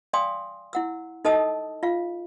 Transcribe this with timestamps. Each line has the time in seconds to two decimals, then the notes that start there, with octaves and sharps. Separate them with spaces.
0.13 D5 F5 G5 G#5 C6 D#6
0.73 E4 F#5 E6
1.25 D#4 A4 D#5 A5 D#6 E6
1.83 F4 F5